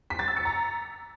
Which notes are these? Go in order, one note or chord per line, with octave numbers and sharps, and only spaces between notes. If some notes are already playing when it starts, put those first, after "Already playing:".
B6
A6
E6
C#7
A#5